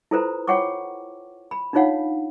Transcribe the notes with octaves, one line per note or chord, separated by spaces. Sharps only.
E4 F4 A4 B4 C5 A#5
F4 C#5 F#5 G5 C#6 D6
B5
D4 D#4 F4 C#5 F5 F#5